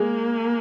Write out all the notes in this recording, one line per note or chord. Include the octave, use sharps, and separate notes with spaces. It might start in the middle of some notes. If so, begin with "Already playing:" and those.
Already playing: G#3 A#3